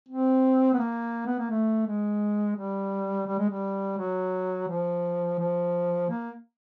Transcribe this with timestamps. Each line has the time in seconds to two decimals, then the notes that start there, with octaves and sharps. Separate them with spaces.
0.09 C4
0.74 B3
0.79 A#3
1.26 B3
1.39 A#3
1.50 A3
1.86 G#3
2.56 G3
3.27 G3
3.39 G#3
3.49 G3
3.98 F#3
4.68 F3
5.39 F3
6.10 A#3